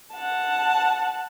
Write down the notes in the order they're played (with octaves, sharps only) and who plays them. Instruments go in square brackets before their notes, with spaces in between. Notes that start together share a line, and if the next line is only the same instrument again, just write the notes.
[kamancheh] F#5 A5